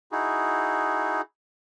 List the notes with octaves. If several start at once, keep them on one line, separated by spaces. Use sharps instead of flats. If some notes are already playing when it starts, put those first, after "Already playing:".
D#4 E4 F#4 G#4